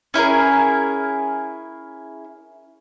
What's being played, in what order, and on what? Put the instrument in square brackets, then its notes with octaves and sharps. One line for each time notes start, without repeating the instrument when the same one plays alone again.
[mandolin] C#4 E4 G#4 A#4